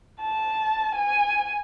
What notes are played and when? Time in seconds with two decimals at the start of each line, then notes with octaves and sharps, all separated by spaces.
0.22 A5
0.95 G#5